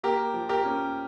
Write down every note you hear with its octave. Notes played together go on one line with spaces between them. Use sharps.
A#3 G4 A#4
F3
G4 A#4
C#4